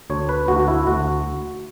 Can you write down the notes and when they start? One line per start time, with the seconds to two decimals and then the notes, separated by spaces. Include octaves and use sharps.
0.10 D2 C#5
0.29 B4
0.48 D2 F#4
0.60 F#4
0.68 E4
0.87 D2 F#4